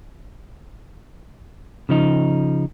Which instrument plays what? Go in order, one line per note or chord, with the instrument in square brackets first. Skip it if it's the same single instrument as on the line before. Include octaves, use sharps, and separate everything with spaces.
[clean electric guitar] C#3 F3 D#4